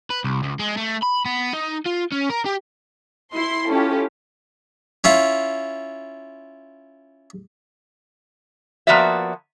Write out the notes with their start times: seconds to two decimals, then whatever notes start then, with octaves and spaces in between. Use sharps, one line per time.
0.10 B4
0.24 C2
0.43 C#2
0.59 G#3
0.77 A3
1.02 B5
1.25 B3
1.54 D#4
1.86 F4
2.12 C#4
2.30 A#4
2.46 G4
3.32 E4 C6
3.71 C#4 E4 F4 G4 A4
5.04 C#4 E4 F4
8.87 F3 A#3 B3 F#4 D5 E5